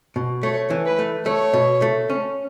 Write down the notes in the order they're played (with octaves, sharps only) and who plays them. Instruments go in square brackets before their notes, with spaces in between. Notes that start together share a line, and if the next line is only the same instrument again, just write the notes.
[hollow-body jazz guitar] B2
[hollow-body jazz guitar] A3 [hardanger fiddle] C#5
[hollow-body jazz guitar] E3
[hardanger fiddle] B4
[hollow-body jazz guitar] A3
[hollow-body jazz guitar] A3 [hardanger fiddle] C#5
[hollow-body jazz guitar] B2
A3
C#4